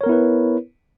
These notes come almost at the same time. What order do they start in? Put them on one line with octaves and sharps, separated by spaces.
C#5 A#4 B3 E4 B4